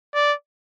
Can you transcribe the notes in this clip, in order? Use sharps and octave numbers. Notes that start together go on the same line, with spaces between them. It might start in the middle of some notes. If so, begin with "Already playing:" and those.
D5